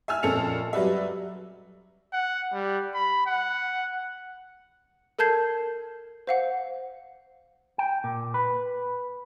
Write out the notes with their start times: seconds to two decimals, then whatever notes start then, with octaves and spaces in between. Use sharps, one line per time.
0.08 E5 G#5 E6 F6
0.23 F2 A#2 C#4 A4 C#7 F7
0.73 F#3 G3 B4 D5 E5
2.13 F#5
2.53 G3
2.94 B5
3.26 F#5
5.19 A4 A#4 A5 G6 G#6 C7
6.27 C5 F5 F#5
7.78 G5
8.04 A#2
8.34 B4